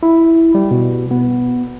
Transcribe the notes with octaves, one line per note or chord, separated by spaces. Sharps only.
E4
G3
B2
B3